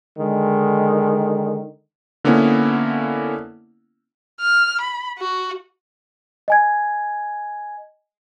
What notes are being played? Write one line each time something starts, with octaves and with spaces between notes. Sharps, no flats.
D3 D#3 G#3
D3 A#3 B3 C#4 E4
F6
B5
F#4
D#5 G#5 G#6